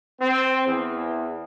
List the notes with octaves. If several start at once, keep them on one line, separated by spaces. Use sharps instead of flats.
C4
E2